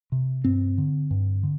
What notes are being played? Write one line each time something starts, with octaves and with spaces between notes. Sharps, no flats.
C3
G2 C4
D3
G2
D3